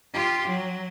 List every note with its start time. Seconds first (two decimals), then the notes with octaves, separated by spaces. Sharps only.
0.13 F4 G4
0.48 F#3